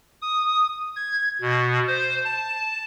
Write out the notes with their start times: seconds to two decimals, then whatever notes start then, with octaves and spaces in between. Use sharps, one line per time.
0.22 D#6
0.96 G#6
1.41 B2
1.87 C5
2.25 A5